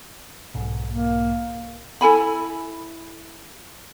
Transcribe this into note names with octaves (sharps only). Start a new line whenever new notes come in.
B1 G#2 B2
A#3
E4 A4 G#5 B5